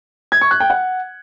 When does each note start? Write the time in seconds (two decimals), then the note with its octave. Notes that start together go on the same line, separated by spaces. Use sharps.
0.32 G#6
0.41 C#6
0.51 F#6
0.60 G5
0.70 F#5